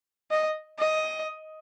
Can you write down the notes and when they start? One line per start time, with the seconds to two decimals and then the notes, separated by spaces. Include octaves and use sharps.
0.31 D#5
0.79 D#5